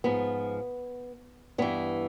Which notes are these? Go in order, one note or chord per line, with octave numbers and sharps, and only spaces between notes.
G#2 F3 B3
G2 E3 B3